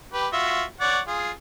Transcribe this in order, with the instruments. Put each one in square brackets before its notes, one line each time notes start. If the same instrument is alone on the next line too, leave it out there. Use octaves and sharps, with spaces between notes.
[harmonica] G4 B4
F4 F#4 E5
C#5 D5 F#5
F4 G#4